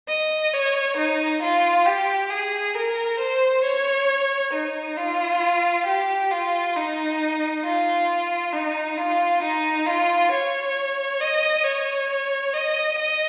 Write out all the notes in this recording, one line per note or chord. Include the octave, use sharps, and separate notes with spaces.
D#5
C#5
D#4
F4
G4
G#4
A#4
C5
C#5
D#4
F4
G4
F4
D#4
F4
D#4
F4
D#4
F4
C#5
D#5
C#5
D#5
D#5